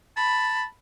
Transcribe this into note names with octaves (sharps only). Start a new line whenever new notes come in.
A5 B5